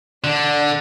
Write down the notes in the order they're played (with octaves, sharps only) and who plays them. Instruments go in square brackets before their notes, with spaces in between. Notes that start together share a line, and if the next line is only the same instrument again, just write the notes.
[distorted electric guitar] D3 [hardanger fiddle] D4 D5